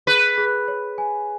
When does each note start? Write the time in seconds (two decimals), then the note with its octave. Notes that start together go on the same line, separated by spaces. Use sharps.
0.07 G#4 B4
0.38 G#4
0.68 C#5
0.98 G#5